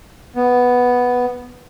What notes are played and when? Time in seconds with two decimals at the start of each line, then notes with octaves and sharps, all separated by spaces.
0.36 B3